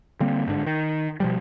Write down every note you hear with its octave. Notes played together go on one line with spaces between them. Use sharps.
D3 G3 A#3 C4
G1 G#2 D3
D#3
B2 F3 G3